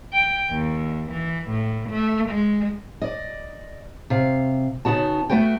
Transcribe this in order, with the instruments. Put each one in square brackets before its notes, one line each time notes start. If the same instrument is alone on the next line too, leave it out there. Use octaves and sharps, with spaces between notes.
[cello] G5
D#2
E3
A2
A3
G#3
[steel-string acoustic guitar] D5 D#5
C3 F5
C#3 B3 D#4 F#4 A5
A3 B3 F#4 B4 G5